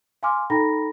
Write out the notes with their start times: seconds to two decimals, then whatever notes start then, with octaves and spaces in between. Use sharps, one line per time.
0.23 F5 G#5 C6 D6 F6
0.50 D#4 A4 G5 A#5 B5 A#6